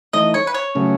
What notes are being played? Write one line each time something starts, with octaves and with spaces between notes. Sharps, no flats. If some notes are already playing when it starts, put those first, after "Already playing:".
E3 A3 D#4 D#5
C#5
B4
C#5
C#3 F#3 A3 C#4